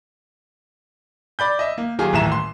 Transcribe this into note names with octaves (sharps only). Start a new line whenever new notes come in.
D5 B5 G6
D#5 E5
A#3
D#3 F#3 F4 G4 G#4
D#1 A1 A2 E5 A#5 E7
C6